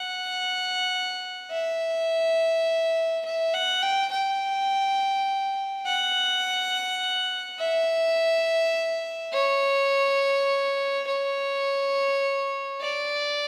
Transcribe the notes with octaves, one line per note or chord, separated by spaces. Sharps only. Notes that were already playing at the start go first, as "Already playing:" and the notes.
Already playing: F#5
E5
E5
F#5
G5
G5
F#5
E5
C#5
C#5
D5